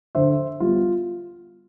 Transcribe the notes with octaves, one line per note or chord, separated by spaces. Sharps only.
D3 C5 E5
G3 B3 F4